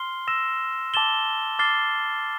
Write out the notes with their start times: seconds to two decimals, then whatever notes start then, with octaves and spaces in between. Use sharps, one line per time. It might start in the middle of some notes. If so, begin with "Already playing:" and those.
Already playing: C6 F6 C7 G7
0.28 E6 A#6 E7
0.94 A5 D6 A6 E7 G7
1.59 D6 F6 A6 C7 G7